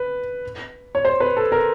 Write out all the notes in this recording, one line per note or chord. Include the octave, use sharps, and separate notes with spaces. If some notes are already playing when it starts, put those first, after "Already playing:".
Already playing: B4
C#5
C5
B4
A4
A#4